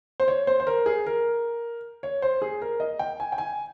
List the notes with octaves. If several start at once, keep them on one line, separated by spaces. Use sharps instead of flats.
C5
C#5
C5
C5
A#4
G#4
A#4
C#5
C5
G#4
A#4
D#5
G5
G#5
G5
G#5